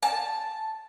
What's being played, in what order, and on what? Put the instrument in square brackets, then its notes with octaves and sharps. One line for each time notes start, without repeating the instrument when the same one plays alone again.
[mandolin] A5